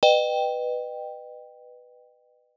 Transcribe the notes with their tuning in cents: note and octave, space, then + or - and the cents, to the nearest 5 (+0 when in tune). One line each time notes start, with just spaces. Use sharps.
B4 +0 D#5 -35 G5 +0